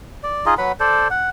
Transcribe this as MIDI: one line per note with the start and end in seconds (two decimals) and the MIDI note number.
0.23 0.45 74
0.46 0.54 63
0.46 0.54 65
0.46 0.54 68
0.46 0.54 75
0.58 0.72 54
0.58 0.72 71
0.58 0.72 78
0.58 0.72 83
0.80 1.08 69
0.80 1.08 72
0.80 1.08 74
1.10 1.30 78